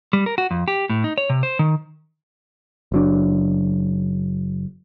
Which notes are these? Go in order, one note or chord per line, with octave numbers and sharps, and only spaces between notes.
G3
A#4
F#4
F2
G4
A2
D#4
C#5
C3
C5
D#3
F#1 F#3 D4